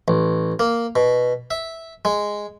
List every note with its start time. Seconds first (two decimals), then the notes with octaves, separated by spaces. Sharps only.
0.08 A1
0.59 A#3
0.96 B2
1.51 E5
2.05 G#3